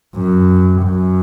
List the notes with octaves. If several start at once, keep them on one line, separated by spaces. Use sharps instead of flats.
F#2
F#2